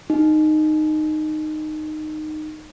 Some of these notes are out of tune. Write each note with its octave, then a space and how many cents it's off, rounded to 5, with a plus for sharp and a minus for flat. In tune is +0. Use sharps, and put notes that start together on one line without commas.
D#4 -15